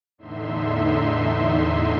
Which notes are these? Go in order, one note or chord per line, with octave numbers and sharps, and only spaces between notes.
E2 A2 D3 D#4 E5 C6